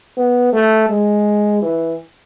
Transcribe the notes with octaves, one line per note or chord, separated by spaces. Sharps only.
B3
A3
G#3
E3